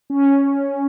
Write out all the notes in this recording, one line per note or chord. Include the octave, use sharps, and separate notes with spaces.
C#4